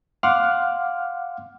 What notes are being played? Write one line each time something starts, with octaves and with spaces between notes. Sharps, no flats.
F5 F#5 C6 D6 F6 F#6